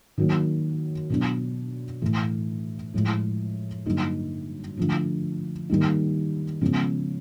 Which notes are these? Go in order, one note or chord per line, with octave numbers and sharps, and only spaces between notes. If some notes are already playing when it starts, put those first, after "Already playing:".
D#3 F#3 A#3
B2 F#3 B3 D4
A2 E3 A3
A2 F3 G#3
G2 D3 F#3 A#3 D#4
D3 F3 A3
D#3 G3 A#3 D#4
C#3 F3 G#3 B3